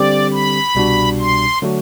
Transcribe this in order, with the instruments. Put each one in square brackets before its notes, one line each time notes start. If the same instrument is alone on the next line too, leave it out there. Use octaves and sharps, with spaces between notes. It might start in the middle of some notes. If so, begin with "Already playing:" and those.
Already playing: [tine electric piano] D3 G3 C4 G4 [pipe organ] D5
[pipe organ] B5
[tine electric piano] C2 B2 G3 D4 F#4
[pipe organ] C6
[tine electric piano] D3 F#3 A3 D4 F#4